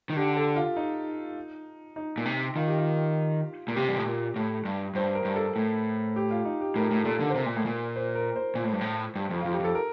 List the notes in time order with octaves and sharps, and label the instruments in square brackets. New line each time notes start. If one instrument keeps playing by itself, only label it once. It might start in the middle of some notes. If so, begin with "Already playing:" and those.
[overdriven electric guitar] D#3
[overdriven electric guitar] D3 [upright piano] G4
[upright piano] A4
F4
D#4
D#4
[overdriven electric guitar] A#2
C3
[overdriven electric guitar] D#3 [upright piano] F4
[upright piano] G4
F4
[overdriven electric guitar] A#2
[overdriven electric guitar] C3 [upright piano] G4
[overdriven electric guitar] G2
A2
A#2
A2
G2
[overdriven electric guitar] G2 [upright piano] C5
[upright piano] A#4
[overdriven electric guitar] G2
[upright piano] A4
[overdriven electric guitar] A2
[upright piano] G4
F4
D#4
G4
[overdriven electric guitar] A2 [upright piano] A#4
[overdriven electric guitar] A2
[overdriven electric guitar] A#2 [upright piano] A4
[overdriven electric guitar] D3
[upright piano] C5
[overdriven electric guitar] C3 [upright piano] A#4
[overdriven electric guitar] A#2
A2
A#2
[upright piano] C5
A#4
C5
[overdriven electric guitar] A#2
A2
G2
A2
G2
F2
[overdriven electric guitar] F2 [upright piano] F4
[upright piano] G4
[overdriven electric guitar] F2 [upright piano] A4
[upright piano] A#4